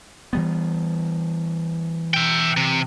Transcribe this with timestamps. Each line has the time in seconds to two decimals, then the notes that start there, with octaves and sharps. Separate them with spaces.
0.33 E3 G3 B3
2.14 E5 G5
2.57 C3